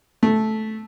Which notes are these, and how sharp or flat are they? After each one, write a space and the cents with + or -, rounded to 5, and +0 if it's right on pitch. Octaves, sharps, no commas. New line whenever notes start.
A3 -10